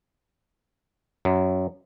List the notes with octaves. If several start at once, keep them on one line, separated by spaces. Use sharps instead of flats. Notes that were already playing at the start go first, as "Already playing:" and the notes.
F#2